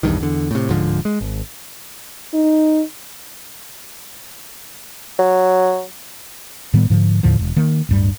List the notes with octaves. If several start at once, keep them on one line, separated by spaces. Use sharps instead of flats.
A#1 E2 G2 D#3
E2 D3
A2 C3
D1 G#2 D3 F3
G#3
G#1
D#4
F#3
A2 D#3 G3 B3
G#2 D3 F3
D#2 A2 D3 F3
E1
D#3 A#3
D1 G2 G3